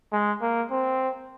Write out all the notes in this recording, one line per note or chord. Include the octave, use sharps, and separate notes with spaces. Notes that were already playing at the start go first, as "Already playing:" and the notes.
G#3
A#3
C4